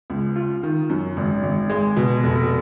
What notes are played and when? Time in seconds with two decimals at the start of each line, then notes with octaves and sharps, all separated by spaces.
0.10 C#2
0.36 F4
0.63 D#3
0.90 F#2
1.17 G#1
1.43 G#1
1.70 G#3
1.97 B2
2.23 F1